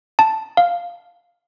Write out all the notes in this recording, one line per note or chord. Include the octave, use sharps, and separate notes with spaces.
A5
F5